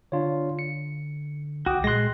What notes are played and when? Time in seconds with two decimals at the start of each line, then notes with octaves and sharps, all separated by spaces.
0.12 D3 D4 F4 C#5
0.59 C#7
1.66 C2 F#4 G5 D6 D#6
1.84 A#2 G#3 C6 F#6 A#6